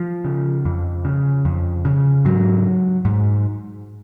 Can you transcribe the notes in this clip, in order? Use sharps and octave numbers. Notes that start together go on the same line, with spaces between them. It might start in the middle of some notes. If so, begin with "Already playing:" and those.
Already playing: F3
C#3
F2
C#3
F2
C#3
G#2 F#3
G#2